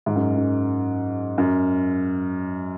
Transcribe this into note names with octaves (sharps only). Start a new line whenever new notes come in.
G#2
F#2
F#2
F#2